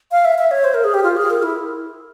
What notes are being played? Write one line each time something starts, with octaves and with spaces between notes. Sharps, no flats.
F5
E5
E5
C#5
C5
A#4
G#4
G4
F4
G#4
A#4
E4